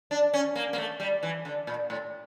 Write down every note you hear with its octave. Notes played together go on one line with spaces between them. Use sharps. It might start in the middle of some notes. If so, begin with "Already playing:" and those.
D4
C#4
A#3
A#3
A3
G3
E3
D3
A#2
A2